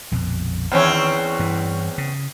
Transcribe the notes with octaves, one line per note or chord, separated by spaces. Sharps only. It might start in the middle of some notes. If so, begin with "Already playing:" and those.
A#1 F2 B2
E2 D#3 C4 C#4
G2 E3
C#3